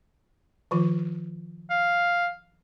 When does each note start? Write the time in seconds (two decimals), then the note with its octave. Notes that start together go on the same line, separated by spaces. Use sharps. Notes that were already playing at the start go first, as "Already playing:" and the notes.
0.71 D#3 F3 F4
1.70 F5